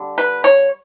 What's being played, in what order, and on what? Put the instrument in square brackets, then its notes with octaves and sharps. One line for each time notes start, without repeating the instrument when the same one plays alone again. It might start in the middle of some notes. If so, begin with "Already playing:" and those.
Already playing: [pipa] D3 G3
B4
C#5